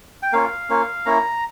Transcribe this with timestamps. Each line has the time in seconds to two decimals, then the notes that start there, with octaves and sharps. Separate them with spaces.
0.23 G5
0.32 A#3 C#4 F4 F5
0.69 A#3 C#4 F4
1.06 A#3 C#4 E4 A#5